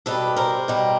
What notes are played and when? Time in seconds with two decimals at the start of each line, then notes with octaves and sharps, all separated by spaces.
0.06 B2 G3 A4 B4
0.37 A#4 C5
0.68 B2 G3